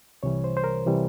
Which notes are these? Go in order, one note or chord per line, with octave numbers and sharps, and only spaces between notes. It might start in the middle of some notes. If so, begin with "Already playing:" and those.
C2 C3 E3 G3 C#5
C5
C5
A#4
C3 E3 G3